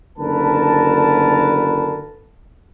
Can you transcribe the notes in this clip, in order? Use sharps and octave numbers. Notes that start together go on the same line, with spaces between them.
F#1 D2 D3 A#4 B4 A5